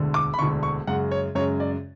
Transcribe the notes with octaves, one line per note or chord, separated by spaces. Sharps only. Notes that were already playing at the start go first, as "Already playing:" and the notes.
Already playing: E1 D2 D3
D6
B5
E1 D2 D3 C#6
C#6
F#2 C#3 G#3 F#5
C#5
F#2 C#3 G#3 C#5
D5